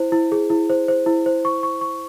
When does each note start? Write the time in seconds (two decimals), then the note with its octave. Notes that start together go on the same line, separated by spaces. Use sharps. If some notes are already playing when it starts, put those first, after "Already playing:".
Already playing: E4 C5
0.12 E4
0.32 G#4
0.50 E4
0.70 C5
0.88 C5
1.06 E4
1.26 C5
1.45 C#6
1.63 C#6
1.81 C#6